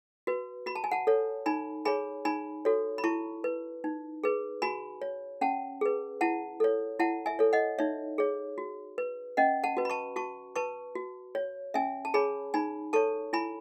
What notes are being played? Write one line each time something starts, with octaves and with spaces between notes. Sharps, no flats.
F#4 B4
F#4 B5
A5
G#5
F#5 A5
A4 C#5
D#4 G#5 B5
G#4 C#5 G#5 B5
D#4 G#5 B5
F#4 A4 C#5
B5
E4 A5 C#6
B4
D#4
G#4 B4
F#4 G#5 B5
C#5
C#4 F#5 A5
G#4 B4
E4 F#5 A5
A4 C#5
E4 F#5 A5
E5 G#5
A4 C#5
D#5 F#5
D#4 C#5 E5
G#4 C#5
F#4
B4
C#4 D#5 F#5
F#5 A5
F#4 B4
B5
A5 C#6
F#4 A5 C#6
B4 A5 C#6
F#4
C#5
C#4 E5 G#5
A5
G#4 C#5 G#5 B5
D#4 G#5 B5
A4 C#5 A5 C#6
E4 G#5 B5